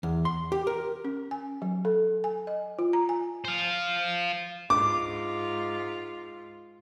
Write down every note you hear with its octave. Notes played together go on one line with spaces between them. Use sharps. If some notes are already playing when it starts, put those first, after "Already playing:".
E2
C6
G4
A#4
C#4
G#5
F#3
A4
G#5
D#5
F4
A#5
G#5
C5 F5
G#2 F4 D6